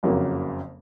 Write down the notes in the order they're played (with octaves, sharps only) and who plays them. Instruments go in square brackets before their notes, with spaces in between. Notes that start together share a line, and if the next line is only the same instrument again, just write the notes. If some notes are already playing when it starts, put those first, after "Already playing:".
[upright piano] F#1 F2 C#3 F#3 A#3